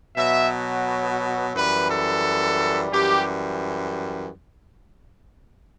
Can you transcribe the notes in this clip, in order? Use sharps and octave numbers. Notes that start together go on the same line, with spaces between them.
B2 F#3 E5
F#2 E3 G3 B4
A4
F#2 E3 G3 G4